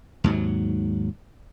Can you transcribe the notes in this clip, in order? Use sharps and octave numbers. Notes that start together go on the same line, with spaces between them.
D#2 G#2 F#3